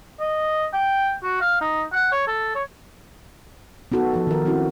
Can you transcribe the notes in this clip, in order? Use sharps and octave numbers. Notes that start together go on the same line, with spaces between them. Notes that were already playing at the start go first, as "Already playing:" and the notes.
D#5
G5
F#4
F5
D#4
F#5
C#5
A4
C#5
B3 D#4 F#4 A4
F3 A4
D#3 F#4 A#4
C4 C#4 E4 F#4